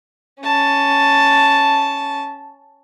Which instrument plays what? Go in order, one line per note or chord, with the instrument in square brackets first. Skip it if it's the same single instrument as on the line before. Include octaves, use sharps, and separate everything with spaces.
[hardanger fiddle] C#4 A5